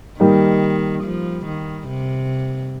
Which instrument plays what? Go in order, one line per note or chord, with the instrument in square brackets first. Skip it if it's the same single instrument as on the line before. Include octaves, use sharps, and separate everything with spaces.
[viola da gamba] D#3 [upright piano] G3 A#3 D#4 G4
[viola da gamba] F3
D#3
C3